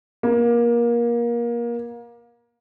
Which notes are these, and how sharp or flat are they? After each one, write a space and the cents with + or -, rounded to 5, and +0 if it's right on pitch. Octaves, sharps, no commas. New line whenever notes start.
A#3 +25